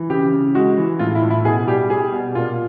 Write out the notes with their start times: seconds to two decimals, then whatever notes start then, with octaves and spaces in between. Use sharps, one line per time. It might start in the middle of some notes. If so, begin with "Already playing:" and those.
Already playing: E3
0.10 C#3 G4
0.33 C#3
0.55 G#3 F#4
0.77 E3
0.99 A2 F4
1.15 E4
1.23 A2
1.30 E4
1.45 B2 G#4
1.67 G3 G4
1.90 G3 G#4
2.12 B2
2.35 A#2 F4